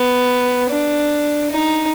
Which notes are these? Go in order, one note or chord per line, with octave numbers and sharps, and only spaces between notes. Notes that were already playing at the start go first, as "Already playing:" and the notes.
Already playing: B3
D4
D#4